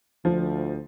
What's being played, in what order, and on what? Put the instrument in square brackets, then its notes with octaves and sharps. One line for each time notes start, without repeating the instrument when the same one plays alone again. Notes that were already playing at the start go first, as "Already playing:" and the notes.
[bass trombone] D2 [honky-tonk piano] F3